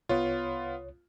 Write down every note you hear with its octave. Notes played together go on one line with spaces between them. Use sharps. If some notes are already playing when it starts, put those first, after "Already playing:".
C2 B3 F4 C#5